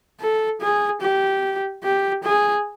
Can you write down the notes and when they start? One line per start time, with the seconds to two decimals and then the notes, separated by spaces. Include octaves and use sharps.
0.20 A4
0.61 G#4
1.02 G4
1.84 G4
2.23 G#4